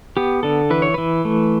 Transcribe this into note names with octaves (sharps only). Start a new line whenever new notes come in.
B3 G4
D3 A4
E3 B4
C#5
E3 B4
A3